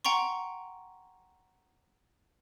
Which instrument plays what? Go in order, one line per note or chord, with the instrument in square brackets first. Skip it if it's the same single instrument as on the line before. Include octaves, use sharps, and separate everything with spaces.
[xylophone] F#5 G5 A#5 C6 C#6